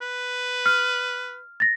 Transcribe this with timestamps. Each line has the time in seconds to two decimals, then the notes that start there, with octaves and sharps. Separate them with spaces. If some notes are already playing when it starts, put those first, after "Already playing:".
0.02 B4
0.66 F6
1.60 A6 A#6